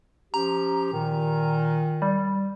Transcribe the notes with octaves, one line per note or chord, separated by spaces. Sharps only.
F3 C#4 G4 A#5
A#2 D#3
G3